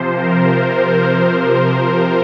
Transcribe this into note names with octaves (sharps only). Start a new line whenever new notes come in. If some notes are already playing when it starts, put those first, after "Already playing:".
Already playing: C3 F3 C5
A#4
A#4
C5
C5